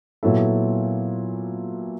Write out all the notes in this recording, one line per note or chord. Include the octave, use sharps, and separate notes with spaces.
A#2 F#3 B3 E4 A4